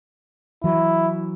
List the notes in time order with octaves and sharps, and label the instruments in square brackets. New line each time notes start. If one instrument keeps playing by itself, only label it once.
[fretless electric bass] E3 F#3 [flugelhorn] E4